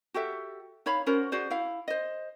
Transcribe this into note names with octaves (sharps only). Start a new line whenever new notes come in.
F#4 G4 A4 E5
D#4 C#5 F5 B5
C#4 F#4 A#4 C5
F#4 G#4 C5 D5
E4 F5
C5 D#5